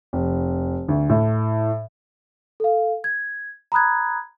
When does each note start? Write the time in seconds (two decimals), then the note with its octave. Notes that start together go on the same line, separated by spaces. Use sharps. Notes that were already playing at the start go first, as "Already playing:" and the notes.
0.13 F1
0.88 D2
1.09 A2
2.60 A4 F5
3.04 G#6
3.72 A#5 B5 D#6 F#6 G#6